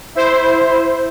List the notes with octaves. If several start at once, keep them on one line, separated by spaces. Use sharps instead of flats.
E4 C5